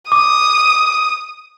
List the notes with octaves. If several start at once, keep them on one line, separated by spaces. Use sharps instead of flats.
D6 D#6